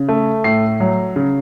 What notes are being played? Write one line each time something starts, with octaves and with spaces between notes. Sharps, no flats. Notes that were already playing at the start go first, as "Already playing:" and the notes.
Already playing: C#3
A3
A2 C7
F#3
C#3